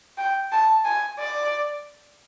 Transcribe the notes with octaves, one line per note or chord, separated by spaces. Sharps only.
G5
A5
G#5
D5